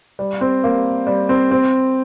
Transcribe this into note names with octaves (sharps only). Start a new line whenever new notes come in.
G3
C4
A#3
G3
C4
C4